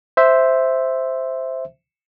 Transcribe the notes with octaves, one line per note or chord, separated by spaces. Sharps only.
C5 E5